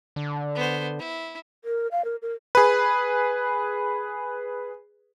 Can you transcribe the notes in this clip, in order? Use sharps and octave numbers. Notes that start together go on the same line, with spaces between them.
D3
B3 C5
E4
A#4
F5
A#4
A#4
G#4 B4